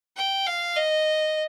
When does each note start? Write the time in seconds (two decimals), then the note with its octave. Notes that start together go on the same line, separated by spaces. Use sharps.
0.17 G5
0.46 F5
0.76 D#5